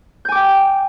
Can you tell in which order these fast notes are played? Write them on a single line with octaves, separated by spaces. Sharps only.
G6 G#5 D6 G5